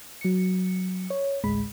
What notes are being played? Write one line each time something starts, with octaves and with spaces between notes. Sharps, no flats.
F#3 C#7
C#5
A1 D2 G#3 B5